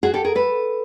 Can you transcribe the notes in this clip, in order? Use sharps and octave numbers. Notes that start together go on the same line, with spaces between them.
F#4 G#4
G4 A4
G#4 A#4
A4 B4